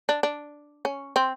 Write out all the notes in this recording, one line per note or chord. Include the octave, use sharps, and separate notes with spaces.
D4
D4
C#4
C4